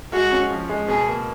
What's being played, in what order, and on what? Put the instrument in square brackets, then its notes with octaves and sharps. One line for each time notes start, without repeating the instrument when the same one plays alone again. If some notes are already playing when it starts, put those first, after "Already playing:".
[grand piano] G#3 [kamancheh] F#4
[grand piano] C#4
F3
G#3
[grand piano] B2 [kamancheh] G#4
[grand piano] A#3